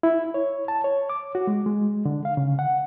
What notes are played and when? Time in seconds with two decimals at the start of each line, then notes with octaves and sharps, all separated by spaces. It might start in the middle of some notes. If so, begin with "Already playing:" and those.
0.03 E4
0.34 C#5
0.68 A5
0.84 C#5
1.10 D6
1.35 F#4
1.47 G#3
1.66 G#3
2.05 D3
2.25 F5
2.37 C#3
2.59 F#5